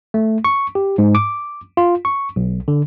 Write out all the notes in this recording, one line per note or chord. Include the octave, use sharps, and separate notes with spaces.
A3
C#6
G4
G#2
D6
F4
C#6
B1
D3